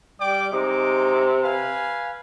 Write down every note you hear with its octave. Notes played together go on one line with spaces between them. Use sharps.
G3 D5 G5 D6
C3 G#3 D#4 D6
B4 F5 G#5